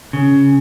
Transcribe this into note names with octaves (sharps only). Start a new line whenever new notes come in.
C#3